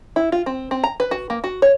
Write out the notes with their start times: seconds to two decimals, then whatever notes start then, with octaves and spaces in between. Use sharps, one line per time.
0.16 E4
0.32 F4
0.46 C4
0.71 C4
0.84 A#5
1.00 B4
1.11 F#4
1.30 A#3
1.44 F#4
1.62 C#5